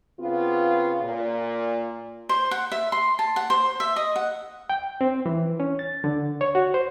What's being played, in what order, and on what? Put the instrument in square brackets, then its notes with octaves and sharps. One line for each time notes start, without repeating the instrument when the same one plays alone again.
[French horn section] C#3 B3 C4 F4
A#2
[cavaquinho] C5
F#5
E5
C6
A5
F#5
C5
E5
D#5
F#5
[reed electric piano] G5
C4
E3
C#4
A6
D3
C#5
F#4
C5